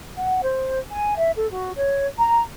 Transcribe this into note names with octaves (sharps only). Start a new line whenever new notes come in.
F#5
C5
G#5
E5
A4
F#4
C#5
A#5